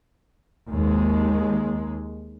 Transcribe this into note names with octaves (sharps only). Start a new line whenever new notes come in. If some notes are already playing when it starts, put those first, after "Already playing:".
D#2 G#3